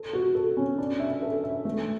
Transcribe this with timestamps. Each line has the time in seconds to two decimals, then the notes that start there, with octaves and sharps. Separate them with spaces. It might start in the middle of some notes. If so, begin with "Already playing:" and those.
Already playing: A4
0.13 F#4
0.35 A4
0.57 C#4
0.78 D4
1.00 E5
1.22 A4
1.44 E5
1.65 A3